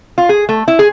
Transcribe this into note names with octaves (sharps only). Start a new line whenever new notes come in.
F4
G#4
A3
E4
G#4